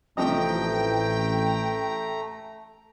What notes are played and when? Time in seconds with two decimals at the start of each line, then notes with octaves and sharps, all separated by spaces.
0.17 A1 C3 F3 A3 D#5 G5 A#5